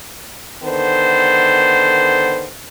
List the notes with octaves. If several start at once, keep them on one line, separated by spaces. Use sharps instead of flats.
D3 D#3 B3 A4 C5